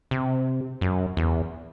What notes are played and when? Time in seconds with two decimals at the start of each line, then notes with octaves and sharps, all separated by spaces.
0.11 C3
0.81 F#2
1.17 E2